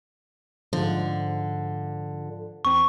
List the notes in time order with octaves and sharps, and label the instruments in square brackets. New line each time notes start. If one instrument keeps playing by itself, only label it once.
[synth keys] G#2 F3 [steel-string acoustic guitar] D3
[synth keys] E2 C4 [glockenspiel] C#6